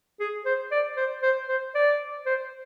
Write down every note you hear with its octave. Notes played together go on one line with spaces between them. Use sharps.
G#4
C5
D5
C5
C5
C5
D5
C5